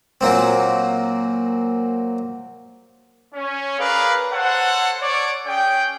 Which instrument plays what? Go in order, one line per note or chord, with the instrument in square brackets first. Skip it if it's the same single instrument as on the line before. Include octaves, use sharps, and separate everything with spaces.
[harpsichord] A#2 F#3 A#3 C4
[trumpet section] C#4
G#4 A#4 B4 D5 F5
A4 C5 C#5 F#5
C#5 D5
C#4 G#4 G5